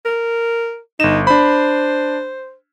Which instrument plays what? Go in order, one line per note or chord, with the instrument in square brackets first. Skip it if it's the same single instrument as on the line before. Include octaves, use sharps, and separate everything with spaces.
[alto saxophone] A#4
[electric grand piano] G1 E7 [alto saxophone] D#4
[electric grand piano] D4 B5 [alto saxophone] C5